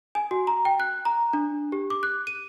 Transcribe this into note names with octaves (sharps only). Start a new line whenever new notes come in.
G#5
F#4
A#5
G5
F#6
A#5
D4
G4
D6
F#6
D#7